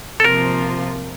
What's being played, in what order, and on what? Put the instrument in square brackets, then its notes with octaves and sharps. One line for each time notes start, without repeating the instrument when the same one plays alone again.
[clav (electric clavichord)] A4
[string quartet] C3 F3 A#3 F4 [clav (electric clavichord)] A#4